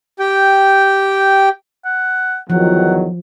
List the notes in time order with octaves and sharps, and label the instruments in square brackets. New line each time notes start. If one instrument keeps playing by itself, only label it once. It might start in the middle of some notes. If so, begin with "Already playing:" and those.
[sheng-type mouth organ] G4 G5
[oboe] F#5
[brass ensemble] E2 D#3 [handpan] F3 [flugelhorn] F#3 [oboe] F#5